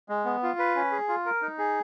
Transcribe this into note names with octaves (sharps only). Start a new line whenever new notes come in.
G#3
B3
F4
B4
C#4
G#4
F4
A#4
D#4
G#4